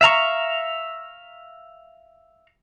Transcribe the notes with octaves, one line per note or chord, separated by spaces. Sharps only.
E5 F5 A#5 C#6